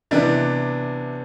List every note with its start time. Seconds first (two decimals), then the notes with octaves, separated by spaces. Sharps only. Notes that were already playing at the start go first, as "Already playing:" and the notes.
0.11 C3 E3 B3 D4